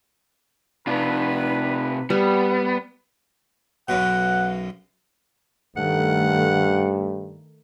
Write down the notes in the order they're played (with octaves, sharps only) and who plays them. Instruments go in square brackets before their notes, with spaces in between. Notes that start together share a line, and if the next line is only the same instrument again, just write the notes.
[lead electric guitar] C3 F4 [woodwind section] D4 D#4 B4
[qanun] G3 [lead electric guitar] B3
[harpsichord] B1 F#2 B2 [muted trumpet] F#5
[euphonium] G2 [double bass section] D#3 A3 [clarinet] F#5